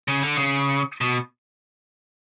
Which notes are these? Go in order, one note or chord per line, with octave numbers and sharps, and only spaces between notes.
C#3
D3
C#3
B2